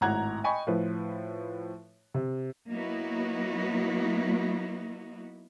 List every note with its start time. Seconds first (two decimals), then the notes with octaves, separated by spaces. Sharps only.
0.01 G#1 A2 F#5 A#5 F#6 G#6
0.44 D#5 G5 G#5 B5 C#6
0.67 A2 F3 B4
2.14 C3
2.69 F#3 A#3 B3 D#4 E4 F#4